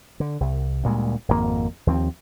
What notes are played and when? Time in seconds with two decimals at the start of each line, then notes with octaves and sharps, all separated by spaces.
0.20 D3
0.40 C2
0.84 D2 A#2 G3 G#3
1.28 G#1 F2 C3 A#3
1.87 D#2 F3 B3 C4